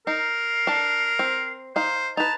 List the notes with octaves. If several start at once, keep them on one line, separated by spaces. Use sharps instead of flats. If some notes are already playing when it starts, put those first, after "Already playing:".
D#4 A#4 C7
D4 A5
C4
D#4 C5 F5
D#4 B4 A5 F7